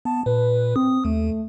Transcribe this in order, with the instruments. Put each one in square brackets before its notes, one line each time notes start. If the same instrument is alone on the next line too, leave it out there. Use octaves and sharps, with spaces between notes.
[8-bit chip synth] B3 [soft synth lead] A5
[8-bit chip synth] A#2 [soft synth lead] B4
[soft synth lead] C4 [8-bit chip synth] D#6
[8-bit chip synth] D#2 [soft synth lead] A3